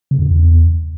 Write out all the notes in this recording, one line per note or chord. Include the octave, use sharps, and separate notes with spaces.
C#3
F2
E2